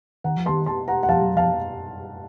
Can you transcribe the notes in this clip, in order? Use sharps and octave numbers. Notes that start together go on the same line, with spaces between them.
D#3 F#5 A#5
F3
D#3 A5 C6
A5 C6
F#5 A#5
F#5
F3 F5 A5
F#3
F3 F5 A5